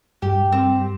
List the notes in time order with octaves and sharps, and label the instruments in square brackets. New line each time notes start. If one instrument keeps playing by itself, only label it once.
[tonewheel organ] G2 [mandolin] G4
[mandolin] C4